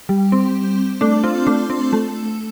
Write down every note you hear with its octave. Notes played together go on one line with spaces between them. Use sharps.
G3
C4
A3 D4
C4 F4
A3 D4
C4
A3